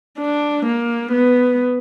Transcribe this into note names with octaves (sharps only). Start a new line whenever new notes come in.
D4
A#3
B3